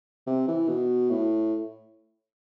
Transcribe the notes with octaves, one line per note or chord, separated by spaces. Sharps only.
C3
E3
B2
A2